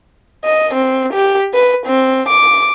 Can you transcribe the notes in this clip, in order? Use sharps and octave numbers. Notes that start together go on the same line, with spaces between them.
D#5
C4
G4
B4
C4
D6